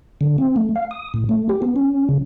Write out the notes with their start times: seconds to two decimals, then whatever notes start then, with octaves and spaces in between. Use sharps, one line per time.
0.21 D3
0.38 C4
0.56 A3
0.76 F5
0.91 D#6
1.14 A2
1.29 A3
1.49 G4
1.62 B3
1.76 C#4
2.09 C#3